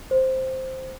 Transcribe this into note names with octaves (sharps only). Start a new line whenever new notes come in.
C5